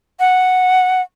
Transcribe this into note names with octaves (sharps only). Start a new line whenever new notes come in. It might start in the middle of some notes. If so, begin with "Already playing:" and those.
F#5